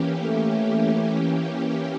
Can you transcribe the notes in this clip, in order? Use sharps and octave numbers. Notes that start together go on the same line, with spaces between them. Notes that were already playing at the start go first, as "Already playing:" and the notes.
Already playing: E3 A#3 C#4 G4
A3